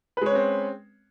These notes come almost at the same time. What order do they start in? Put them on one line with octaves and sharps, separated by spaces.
B4 G#3 C#5 C#4 C4